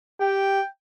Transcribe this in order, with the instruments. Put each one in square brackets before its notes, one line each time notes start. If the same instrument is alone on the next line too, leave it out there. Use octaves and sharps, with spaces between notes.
[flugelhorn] G4 [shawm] G5